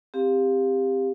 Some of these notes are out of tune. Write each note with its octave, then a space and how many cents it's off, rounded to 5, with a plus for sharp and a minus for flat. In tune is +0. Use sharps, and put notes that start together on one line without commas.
C4 +0 G4 +20 F5 +5